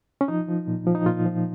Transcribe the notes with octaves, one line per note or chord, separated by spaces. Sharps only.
C#4
F3 D#4
F3
A#2
F3
D#4
A#2 F4
F3